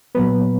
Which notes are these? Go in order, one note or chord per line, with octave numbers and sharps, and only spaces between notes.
A#2 F#3 B3 B4